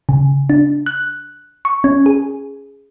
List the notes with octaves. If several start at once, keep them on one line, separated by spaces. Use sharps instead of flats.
C#3
D4
F#6
C#6
C#4
G#4